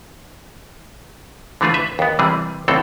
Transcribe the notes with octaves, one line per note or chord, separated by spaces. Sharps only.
D3 E3 A3 F4 G#4
B4 E5
D#2 B3
C3 E3 G3 G#4
C#2 A2 E3 C4 A4